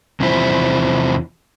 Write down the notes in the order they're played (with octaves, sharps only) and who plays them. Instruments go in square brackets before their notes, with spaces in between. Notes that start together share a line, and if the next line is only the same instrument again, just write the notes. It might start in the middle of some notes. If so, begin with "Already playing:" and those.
[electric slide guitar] E2 C3 F3 E4 C5